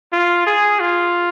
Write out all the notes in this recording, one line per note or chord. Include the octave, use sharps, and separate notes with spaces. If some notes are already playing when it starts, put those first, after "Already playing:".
F4
G#4
F4